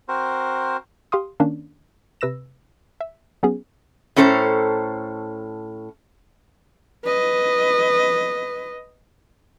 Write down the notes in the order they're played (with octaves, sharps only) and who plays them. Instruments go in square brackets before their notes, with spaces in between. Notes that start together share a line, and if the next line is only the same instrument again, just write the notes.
[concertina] C4 F#4 A#4 C5
[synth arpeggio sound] G4 F5 C6 D#6
D#3 A#3 C#4 D4
C3 B4 E6 A#6 E7
E5
F#3 B3 C#4 G#4
[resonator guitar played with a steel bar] A2 C#4 A4 C5 A#5
[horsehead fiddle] B4 D#5